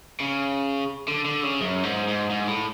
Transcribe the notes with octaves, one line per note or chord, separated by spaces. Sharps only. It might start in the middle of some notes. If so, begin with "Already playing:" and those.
C#3
D3
D3
C#3
F#2
G#2
G#2
G#2
A2